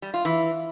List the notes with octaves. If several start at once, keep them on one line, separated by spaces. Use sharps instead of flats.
G3
F4
E3